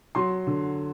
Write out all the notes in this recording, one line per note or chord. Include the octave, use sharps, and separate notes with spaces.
F#3 C6
D3